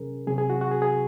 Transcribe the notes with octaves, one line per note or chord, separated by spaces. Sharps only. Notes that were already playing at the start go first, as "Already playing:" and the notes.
Already playing: C3 F#3 C#4 G#4 A#4
C3 F#3 C4 G#4
G#4
F#4
F#4
G#4
G#4